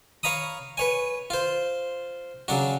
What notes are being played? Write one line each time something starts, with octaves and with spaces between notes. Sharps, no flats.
C#5 F5 A#5 B5 D#6
B4 C#5 G#5
F4 C5
C#3 F#3 D4 F#4